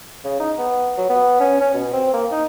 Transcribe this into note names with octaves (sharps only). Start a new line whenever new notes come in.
C#3
D#4
B3
F#3
B3
C#4
C#4
B2
C4
A#3
D#4